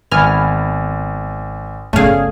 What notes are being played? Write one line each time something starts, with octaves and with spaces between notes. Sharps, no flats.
G#1 B3 G#5 F6
G1 C#2 A3 C#4 G#4 F5